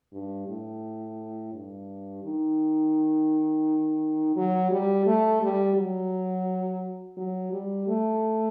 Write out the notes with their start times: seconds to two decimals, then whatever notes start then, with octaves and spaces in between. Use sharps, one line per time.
0.12 G2
0.47 A2
1.53 G2
2.23 D#3
4.36 F#3
4.71 G3
5.06 A3
5.42 G3
5.77 F#3
7.17 F#3
7.52 G3
7.88 A3